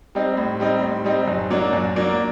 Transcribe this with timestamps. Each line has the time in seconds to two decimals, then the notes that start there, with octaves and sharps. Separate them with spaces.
0.15 G3 C4 D#4
0.37 A2
0.60 G3 C4 D#4
0.83 A2
1.05 G3 C4 D#4
1.28 F#2
1.50 F#3 A#3 D4
1.73 F#2
1.96 F#3 A#3 D4